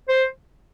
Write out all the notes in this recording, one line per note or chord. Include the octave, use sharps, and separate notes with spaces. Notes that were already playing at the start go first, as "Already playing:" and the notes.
C5